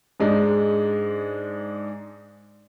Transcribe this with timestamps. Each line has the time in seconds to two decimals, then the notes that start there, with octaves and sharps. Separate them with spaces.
0.20 G#2 G#3 D4 D#4